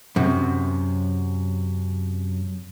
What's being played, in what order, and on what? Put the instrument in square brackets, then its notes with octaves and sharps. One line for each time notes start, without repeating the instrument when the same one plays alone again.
[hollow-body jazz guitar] F#2 C3